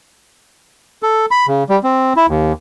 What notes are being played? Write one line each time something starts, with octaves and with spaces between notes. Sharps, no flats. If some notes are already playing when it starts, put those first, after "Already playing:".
A4
B5
C#3
G3
C4
E4
D#2